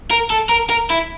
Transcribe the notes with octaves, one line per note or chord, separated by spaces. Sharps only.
A#4
A4
A#4
A#4
E4